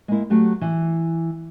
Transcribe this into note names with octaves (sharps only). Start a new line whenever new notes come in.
G#3 A#3 E4
F#3 A3 F#4 G4
E3